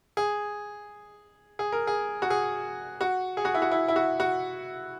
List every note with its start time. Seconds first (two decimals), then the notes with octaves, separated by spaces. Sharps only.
0.17 G#4
1.59 G#4
1.72 A#4
1.87 G#4
2.22 F#4
2.30 G#4
3.01 F#4
3.37 G#4
3.45 F#4
3.54 E4
3.62 F#4
3.71 E4
3.88 E4
3.96 F#4
4.20 F#4